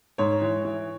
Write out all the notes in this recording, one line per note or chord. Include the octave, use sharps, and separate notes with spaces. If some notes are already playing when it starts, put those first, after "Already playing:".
G#2 C#5
E3
E3